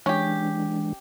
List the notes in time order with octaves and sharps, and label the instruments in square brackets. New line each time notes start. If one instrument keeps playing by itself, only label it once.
[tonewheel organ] E3 G#3 D4 [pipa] C#4 G4